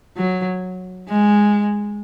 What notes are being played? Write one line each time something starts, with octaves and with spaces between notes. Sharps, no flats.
F#3
G#3